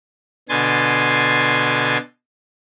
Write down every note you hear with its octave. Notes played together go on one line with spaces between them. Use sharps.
B2 D3 G#5 C6 A6